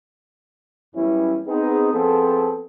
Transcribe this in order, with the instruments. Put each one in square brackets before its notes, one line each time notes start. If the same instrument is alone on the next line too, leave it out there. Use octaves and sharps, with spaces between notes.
[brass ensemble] F#2 E3 G3 B3 C#4 E4
B3 C4 D#4 G#4
F3 B3 C4 G#4 A4